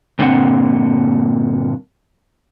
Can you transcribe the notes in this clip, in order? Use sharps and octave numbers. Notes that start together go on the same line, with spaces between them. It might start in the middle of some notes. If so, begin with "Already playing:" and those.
G2 A#2 D3 A#3 C4 F#5